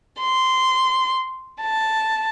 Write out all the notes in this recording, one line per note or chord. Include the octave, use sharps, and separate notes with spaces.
C6
A5